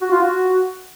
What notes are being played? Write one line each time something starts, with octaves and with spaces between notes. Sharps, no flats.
F#4
F4
F#4